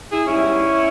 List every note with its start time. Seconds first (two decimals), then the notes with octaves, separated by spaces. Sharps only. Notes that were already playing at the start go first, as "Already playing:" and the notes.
0.10 E4 G#4
0.27 G#2 G3 B3 C#4 E4